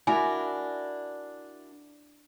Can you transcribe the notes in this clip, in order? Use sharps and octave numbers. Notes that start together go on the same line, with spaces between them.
D4 E4 F#4 A#4 G#5